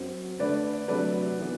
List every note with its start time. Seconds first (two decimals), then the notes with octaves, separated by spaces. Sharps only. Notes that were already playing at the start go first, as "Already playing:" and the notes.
Already playing: F#2 F#3 C4
0.39 D3 A3 D4 B4 D5
0.88 C3 F#3 A3 D4 B4 D5
1.40 E3 B3